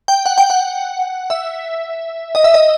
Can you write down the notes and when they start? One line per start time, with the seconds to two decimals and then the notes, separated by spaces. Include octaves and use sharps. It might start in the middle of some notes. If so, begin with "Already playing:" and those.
0.08 G5
0.26 F#5
0.38 G5
0.50 F#5
1.30 E5
2.35 D#5
2.44 E5
2.54 D#5